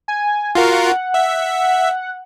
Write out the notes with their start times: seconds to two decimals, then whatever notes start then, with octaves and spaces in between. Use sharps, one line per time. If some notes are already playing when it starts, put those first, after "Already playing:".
0.08 G#5
0.55 F4 F#4 A#4
0.73 F#5
1.14 E5